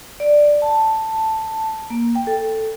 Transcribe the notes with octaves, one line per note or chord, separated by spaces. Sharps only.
D5
A5
A#3
G5
A4